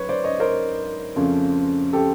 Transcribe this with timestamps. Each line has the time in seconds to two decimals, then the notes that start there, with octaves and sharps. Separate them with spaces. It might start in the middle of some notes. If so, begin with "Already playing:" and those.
Already playing: G#2 F#3 B4 C#5
0.09 C5 D5
0.24 C#5 D#5
0.40 A#4 C5
1.16 F2 C#3 F3 A3 C#4
1.93 G4 A4